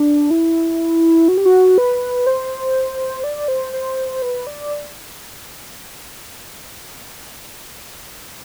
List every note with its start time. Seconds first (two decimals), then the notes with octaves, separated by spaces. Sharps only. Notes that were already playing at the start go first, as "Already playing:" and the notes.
Already playing: D4
0.31 E4
1.28 F#4
1.37 G4
1.45 F#4
1.78 B4
2.27 C5
3.24 D5
3.48 C5
3.73 C5
4.22 B4
4.47 D5